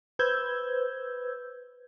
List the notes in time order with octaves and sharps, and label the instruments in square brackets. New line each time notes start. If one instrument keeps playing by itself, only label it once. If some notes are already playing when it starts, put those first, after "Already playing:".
[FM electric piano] B4 C5 E6 G6 G#6